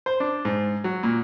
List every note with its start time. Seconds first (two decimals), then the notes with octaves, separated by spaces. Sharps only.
0.06 C5
0.20 D4
0.45 G#2
0.84 F#3
1.03 A#2